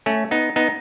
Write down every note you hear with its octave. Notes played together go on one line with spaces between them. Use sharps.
A3 C#4
B3 D#4
B3 D#4